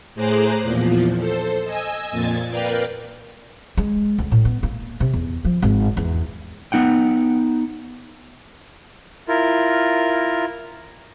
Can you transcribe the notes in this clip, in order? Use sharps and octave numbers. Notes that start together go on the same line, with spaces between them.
A2 G#4 C5 A#5 D6 F#6
E2 A#2 F3
A4 C5
D#5 G#5 E6
F2 A#2 G#6 A6
A#4 B4 D5 F5 G5
G#3
D2
A2
B3
A#3
C3
E2
F3
G#1
E2
B3 D#4 F#5 G5
E4 F4 A#4